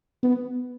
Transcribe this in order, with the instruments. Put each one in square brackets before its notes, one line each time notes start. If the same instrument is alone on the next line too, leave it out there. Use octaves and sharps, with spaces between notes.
[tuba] B3